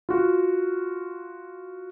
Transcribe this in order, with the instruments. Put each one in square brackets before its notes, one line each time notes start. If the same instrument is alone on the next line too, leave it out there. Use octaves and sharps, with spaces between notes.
[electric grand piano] F4 F#4